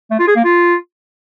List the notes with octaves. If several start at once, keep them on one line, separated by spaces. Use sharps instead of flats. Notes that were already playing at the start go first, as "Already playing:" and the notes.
A3
F4
G#4
A#3
F4